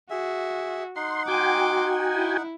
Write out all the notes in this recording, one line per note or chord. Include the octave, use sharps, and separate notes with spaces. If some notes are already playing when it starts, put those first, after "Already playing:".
F#4 G#4 E5
D#4 F#5 C6
F#4 G5 G#5 C6 D6
E4